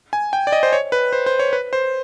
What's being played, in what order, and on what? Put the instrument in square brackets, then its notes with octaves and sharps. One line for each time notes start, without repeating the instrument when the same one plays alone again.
[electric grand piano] G#5
G5
D5
D#5
C5
C#5
B4
C5
C5
C#5
B4
C5